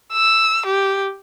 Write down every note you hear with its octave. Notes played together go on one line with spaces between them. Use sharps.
E6
G4